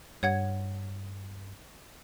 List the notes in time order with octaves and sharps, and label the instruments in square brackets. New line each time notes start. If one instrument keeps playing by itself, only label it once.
[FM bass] G2 [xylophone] C#5 F#5 G#6